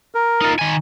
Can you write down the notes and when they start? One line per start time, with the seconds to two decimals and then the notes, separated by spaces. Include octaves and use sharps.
0.15 A#4
0.41 D#4 F4
0.59 D#3 G#5